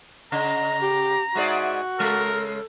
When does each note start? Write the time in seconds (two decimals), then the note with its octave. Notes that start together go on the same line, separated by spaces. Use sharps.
0.32 C#3 D#5 A#5
0.80 G4
1.35 G#2 F#4 G#4 D5 E5
1.99 C#3 G#3 A4 A#4